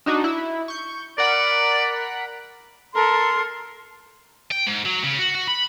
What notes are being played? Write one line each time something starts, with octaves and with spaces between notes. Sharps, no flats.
D4 D#4 F#4
E4
C#6 G6
A#4 D5 F#5 B5
A4 A#4 C6
G5
G#2
F#3
C#3
F#4
F#4
B5